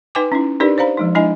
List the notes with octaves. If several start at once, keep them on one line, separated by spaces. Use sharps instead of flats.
D#4 B4 G5 G#5 D6
C#4 D#4 E4
D4 D#4 G4 A#4 B4 D5
C5 D5 F5 A#5 B5
F3 G#3 D#4
G#3 D4 E4 D#5 G#5